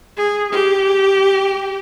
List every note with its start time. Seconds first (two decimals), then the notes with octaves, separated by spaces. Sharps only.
0.17 G#4
0.52 G4